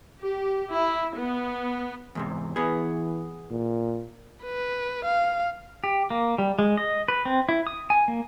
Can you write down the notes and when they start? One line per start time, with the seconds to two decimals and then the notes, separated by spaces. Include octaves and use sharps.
0.20 G4
0.75 E4
1.17 B3
2.15 E2 G#2 C3
2.56 E3 B3 G#4
3.51 A#2
4.44 B4
5.05 F5
5.84 G4
6.10 A#3
6.38 G3
6.59 G#3
6.77 D#5
7.08 B4
7.25 C4
7.49 E4
7.67 D#6
7.90 G#5
8.08 A#3